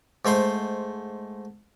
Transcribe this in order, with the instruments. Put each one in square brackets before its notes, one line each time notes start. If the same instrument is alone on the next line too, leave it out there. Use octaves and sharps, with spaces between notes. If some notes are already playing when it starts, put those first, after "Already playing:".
[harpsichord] G#2 A3 C5 C6